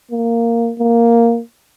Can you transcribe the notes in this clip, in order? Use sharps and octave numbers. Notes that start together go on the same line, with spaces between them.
A#3
A#3